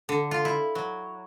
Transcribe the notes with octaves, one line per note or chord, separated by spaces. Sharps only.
D3
F4
E4
F#3